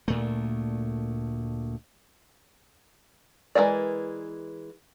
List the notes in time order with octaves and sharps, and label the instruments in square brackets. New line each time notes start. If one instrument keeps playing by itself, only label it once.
[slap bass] D2 A#2 A3
[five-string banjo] E3 G#3 A#4 D5